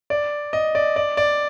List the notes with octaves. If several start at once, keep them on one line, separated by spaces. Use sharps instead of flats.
D5
D#5
D5
D5
D5